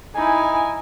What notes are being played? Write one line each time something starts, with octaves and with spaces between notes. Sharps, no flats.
D#4 E4 G#5